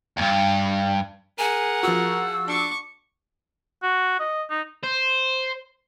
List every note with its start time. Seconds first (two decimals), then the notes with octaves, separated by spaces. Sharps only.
0.17 C#2 G2
1.39 G#4 A#4 F#5 G#5
1.83 F3 F#4 E6
2.48 D4 C#6 D6
3.82 F#4
4.19 D#5
4.50 D#4
4.83 C5